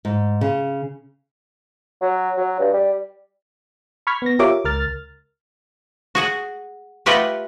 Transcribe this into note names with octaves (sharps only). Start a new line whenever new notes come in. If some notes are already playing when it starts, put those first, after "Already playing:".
G#2
C#3
F#3
F#3
G2
G3
B5 C#6 F6 G#6 B6
B3 A#6
F4 G4 A#4 C#5 E5 D6
C#2 A#4 F6 A6
F#4 G#4 F#5
A3 F4 G4 B4 D#5 F#5